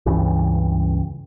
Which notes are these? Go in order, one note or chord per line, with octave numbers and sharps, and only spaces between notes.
C#2 G2 C#3 E3